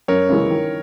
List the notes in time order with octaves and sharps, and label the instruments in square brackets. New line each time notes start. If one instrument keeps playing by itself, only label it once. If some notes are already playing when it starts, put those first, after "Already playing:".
[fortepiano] F#2 [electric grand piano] A#4 C#5
[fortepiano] C#3 E3 G#3 C#4
D#3